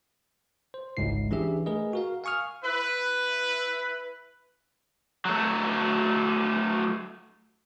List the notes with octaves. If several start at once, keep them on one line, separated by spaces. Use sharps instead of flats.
C5
G#1 C#2 G#2 E4 C7
E3 C#4 D4 G4 G#4 E5
A3 G#4 A#4 B4 D#5
F#4 A#4 F5
F5 G#5 C#6 D#6 F6
E4 B4
F#3 A3